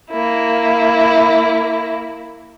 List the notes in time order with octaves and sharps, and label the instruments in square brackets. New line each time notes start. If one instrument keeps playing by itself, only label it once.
[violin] A#3 E4